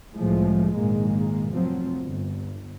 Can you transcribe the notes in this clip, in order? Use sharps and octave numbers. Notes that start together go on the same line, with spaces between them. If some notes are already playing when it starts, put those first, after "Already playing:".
C2 A2 C3 E3 F3 G#3
A#1 G#2 D#3 G#3 A#3
F1 F3 F#3 C4
G1